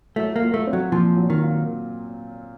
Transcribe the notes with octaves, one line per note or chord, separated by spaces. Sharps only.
F#3 A3
A#3
F4
A3
C4
F#3
A#2 F3
F#3
D#3
F4